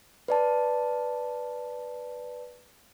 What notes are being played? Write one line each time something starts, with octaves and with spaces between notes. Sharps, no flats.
B4 D5 A5